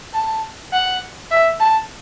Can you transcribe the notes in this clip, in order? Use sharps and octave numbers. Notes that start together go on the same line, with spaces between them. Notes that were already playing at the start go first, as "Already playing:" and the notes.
A5
F#5
E5
A5